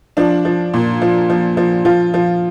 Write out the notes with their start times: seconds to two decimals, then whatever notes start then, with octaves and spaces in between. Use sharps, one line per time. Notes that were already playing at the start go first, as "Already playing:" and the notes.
0.17 F3 D4
0.45 F3
0.74 A#2
1.02 F3
1.30 F3
1.57 F3
1.85 F3 F4
2.14 F3